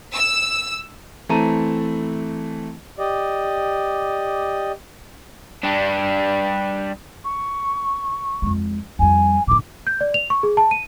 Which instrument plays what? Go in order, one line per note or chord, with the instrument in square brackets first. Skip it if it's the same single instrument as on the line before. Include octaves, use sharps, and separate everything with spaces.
[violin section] E6
[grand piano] E3 A3 C4 A5 A#5 D#7
[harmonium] G4 D5 D#5
[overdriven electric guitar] G3 D4
[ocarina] C#6
[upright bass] F2 G#3
[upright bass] F2 G3 [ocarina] G#5
[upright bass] A2 D3 [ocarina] D6
[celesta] G6
D5
F7
C#6
G#4
A5
D#7